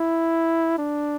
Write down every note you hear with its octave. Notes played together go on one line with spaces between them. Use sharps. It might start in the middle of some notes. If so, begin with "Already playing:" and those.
Already playing: E4
D4